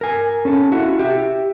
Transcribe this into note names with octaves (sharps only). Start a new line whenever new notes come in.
A#4 G#5
C#4 A4
E4 F#4
G4 E5